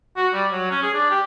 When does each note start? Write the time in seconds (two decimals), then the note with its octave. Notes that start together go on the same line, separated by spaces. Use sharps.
0.17 F#4
0.34 G3
0.51 F#3
0.71 C#4
0.83 G#4
0.94 D4
1.11 G4